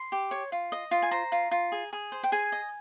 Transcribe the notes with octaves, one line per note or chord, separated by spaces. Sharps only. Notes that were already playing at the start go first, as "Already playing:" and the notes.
Already playing: C6
G4
C#5
F4
D#5
F4
G#5
C5 A#5
F4
F4
G#4
G#4
C5
G5
G#4 G#5
D#5